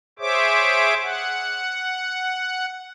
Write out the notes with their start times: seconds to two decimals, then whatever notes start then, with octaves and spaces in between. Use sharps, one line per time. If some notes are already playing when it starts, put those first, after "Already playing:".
0.19 G#4 C5 C#5 E5 D6
1.03 F#5